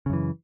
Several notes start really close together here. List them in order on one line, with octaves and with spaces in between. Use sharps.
C#3 F#2 E3